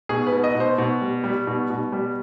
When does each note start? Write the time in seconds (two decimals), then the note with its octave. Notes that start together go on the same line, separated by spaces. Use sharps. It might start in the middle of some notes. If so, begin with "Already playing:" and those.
0.09 B2 G#4
0.27 B4
0.32 B2
0.44 D#5
0.55 B2
0.60 C5
0.78 B2
1.01 G3
1.24 G3
1.47 B2
1.70 B2
1.92 G3